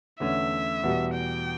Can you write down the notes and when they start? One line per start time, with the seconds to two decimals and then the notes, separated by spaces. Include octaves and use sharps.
0.20 E2 D3 A3 C#4 E5
0.84 E2 B2 G3
1.14 G5